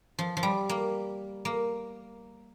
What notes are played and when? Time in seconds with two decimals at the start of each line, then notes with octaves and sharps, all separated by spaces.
0.19 F3
0.37 F3
0.43 G3
0.69 A#3
1.45 A#3